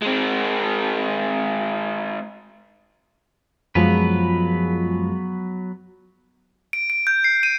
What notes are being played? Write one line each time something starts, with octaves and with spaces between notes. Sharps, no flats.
G#3 C4
F#2 F3 F#3 G#3 B3 B4
D7
D7
G6
C7
D#7